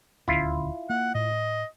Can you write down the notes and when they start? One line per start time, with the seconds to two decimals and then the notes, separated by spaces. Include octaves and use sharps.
0.28 D#1 D2 C#4 E4 F4
0.90 A#3 F#5
1.15 A2 D#5